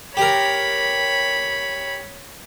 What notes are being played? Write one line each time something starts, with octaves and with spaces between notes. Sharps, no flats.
G4 A#4 C#5 B5